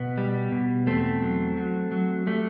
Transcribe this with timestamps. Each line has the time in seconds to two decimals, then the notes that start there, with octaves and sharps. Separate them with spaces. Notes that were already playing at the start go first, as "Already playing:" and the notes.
Already playing: B2 B3
0.18 G3
0.52 B2
0.87 E2 A3 C4
1.22 F#3
1.57 F#3
1.92 F#3
2.27 G3 A3